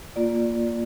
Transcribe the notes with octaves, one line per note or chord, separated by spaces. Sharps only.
A#3 F4 D5